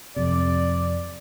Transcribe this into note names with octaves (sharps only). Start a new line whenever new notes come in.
F2 C3 D5